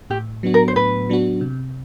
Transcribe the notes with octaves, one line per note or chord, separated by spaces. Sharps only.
A2 G4
F#3 B3 D4 F#4
A#4
C5
A2 B4
F#3 B3 D4 F#4
C3